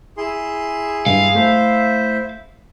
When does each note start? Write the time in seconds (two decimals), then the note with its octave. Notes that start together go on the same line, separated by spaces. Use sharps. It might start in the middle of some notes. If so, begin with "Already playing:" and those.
0.17 E4 G#4 C6
1.06 G2 F5
1.35 A3 E4 C5 E5